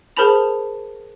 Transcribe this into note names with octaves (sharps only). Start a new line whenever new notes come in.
G#4 A#4 C5 A5 B5 F7